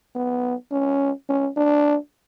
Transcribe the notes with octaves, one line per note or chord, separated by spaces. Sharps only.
B3
C#4
C#4
D4